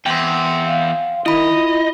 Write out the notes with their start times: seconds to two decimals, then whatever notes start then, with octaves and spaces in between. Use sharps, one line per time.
0.06 E2 G5 C6
0.65 F5
1.26 D#3 E4 D#5 B5
1.54 F4